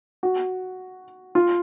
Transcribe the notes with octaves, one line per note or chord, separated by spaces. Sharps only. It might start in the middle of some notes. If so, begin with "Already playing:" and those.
F#4
F4